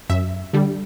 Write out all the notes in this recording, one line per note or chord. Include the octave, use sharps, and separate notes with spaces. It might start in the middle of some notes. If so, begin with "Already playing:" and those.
F#2 E5
D3 G3